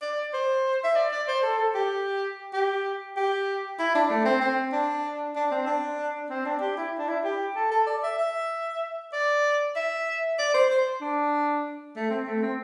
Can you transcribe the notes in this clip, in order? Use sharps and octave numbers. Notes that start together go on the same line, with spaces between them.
D5
C5
E5
D5
D5
C5
A4
A4
G4
G4
G4
E4
D4
A3
C4
C4
D4
D4
C4
D4
C4
D4
G4
E4
D4
E4
G4
A4
A4
D5
E5
E5
D5
E5
D5
C5
C5
D4
A3
C4
A3
C4